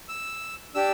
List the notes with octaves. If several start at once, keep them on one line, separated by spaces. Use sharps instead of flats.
E6
D4 G4 E6